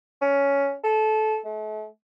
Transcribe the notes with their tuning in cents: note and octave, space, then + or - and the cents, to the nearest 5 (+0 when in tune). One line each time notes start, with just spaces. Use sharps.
C#4 +10
A4 -20
A3 -40